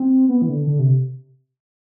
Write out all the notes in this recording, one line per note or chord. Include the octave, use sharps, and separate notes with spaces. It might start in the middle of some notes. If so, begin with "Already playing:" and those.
Already playing: C4
B3
E3
D3
D3
C3